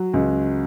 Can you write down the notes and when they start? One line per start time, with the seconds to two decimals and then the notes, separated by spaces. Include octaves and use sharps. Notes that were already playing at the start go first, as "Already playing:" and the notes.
Already playing: F#3
0.14 C#2